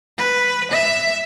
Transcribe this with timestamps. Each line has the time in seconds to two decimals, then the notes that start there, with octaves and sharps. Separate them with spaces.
0.17 B4
0.71 E5